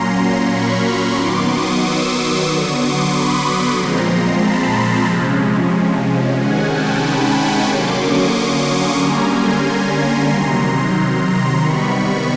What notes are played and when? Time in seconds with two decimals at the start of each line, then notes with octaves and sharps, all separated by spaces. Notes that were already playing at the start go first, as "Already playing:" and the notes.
Already playing: A#2 F#3 A#3 C#4 A#5 C6
0.47 B5 C#6
1.13 D#3 F#3 B3 C6 D6
1.45 C#6 D#6
1.78 D6 E6
2.43 D3 F#3 B3 C#6 D#6
2.77 C6 D6
3.09 B5 C#6
3.42 B5 C#6
3.74 A#2 F3 G#3 C4 A#5 C6
4.39 A5 B5
5.06 C3 F3 G#3 C#4
6.36 C3 D#3 G#3 C#4 F#5 G#5
6.68 G5 A5
7.01 A5 B5
7.34 B5 C#6
7.67 D3 F#3 A#3 C#4 C6 D6
7.99 C#6 D#6
8.64 C#6 D#6
8.97 D3 G3 A#3 C#4 G#5 A#5
9.29 A#5 C6
10.29 C3 D#3 F#3
11.26 A#5 C6
11.59 C3 D#3 G3 B3 B5 C#6
11.91 B5 C#6